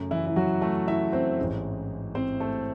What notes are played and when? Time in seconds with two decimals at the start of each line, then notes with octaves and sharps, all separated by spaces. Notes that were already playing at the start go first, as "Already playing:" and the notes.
Already playing: F#2 C#3 F#3 A3
0.11 E3 E4
0.26 E4
0.36 F#3 F#4
0.61 A3 A4
0.87 E4 E5
1.13 C4 C5
1.38 A1 G#2 E3 G#3
2.15 C4 C5
2.40 A3 A4